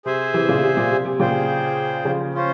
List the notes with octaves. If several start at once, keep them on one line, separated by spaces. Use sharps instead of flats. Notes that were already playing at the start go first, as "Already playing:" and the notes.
C3 G#4 C5 E5 G#5
C3 E3
A#2 C#3
C3
A#2
C3
C3
A#2 C#3 G#4 C5 G5
C#3 F3
C#4 F4 C5